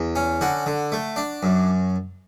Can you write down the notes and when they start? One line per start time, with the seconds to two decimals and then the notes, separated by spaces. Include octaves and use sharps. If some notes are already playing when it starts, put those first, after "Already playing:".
Already playing: E2
0.16 C#4
0.41 D3 F#4
0.66 D3
0.92 A3
1.16 D4
1.43 F#2